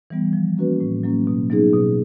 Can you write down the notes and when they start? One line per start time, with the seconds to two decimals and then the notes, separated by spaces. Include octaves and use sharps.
0.10 E3 G3 B3
0.33 F3
0.57 A#3 C#4 F#4 B4
0.80 A2
1.03 F#3 A#3 C#4
1.27 B2
1.50 F#3 B3 D#4 G#4
1.74 B2